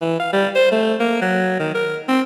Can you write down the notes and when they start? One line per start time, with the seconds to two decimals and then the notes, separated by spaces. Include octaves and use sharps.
0.02 E3
0.20 F5
0.33 G3
0.56 C5
0.72 A3
1.00 A#3
1.22 F#3
1.59 D#3
1.75 A#4
2.09 C4